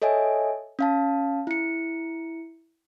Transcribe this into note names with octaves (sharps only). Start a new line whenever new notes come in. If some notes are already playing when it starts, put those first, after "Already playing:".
A4 C#5 D#5 E5 G#5
C#4 F5 A5
E4 C#7